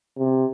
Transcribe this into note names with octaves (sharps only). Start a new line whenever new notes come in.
C3